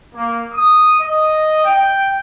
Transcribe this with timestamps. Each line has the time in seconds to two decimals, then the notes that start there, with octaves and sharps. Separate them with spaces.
0.15 A#3
0.54 D#6
1.00 D#5
1.65 G5